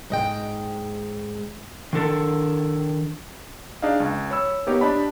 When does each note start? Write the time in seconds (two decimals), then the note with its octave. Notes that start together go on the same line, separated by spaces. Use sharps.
0.10 G#2 D#5 G5
1.93 D#3 D4 A4 A#4
3.82 D4 D#4 G#4 D#5 F5
4.00 C#2
4.31 C#5 B5 E6
4.67 A#3 B3 D#4 G4 C#5
4.81 D4 G4 D#5 A5 B5